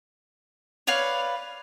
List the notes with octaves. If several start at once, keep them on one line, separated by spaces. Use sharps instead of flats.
B4 C#5 D5 F5